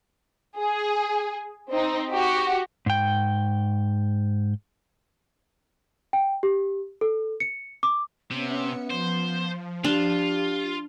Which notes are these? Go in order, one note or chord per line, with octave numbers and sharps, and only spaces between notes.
G#4
C4 D#4
F#4 G4
G#2 G5
G5
G4
A4
C#7
D6
C3 B3 C#4 E5 C#7
F3 C5
D4 F4 G4